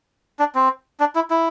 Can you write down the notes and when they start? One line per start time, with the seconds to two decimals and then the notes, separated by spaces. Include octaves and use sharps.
0.39 D4
0.55 C4
1.00 D4
1.15 E4
1.30 E4